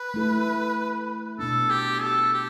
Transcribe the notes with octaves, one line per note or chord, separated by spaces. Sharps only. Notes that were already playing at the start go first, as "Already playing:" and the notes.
Already playing: B4
A3 E4 A4
B2 B3 D4 A4
G4
A4
G4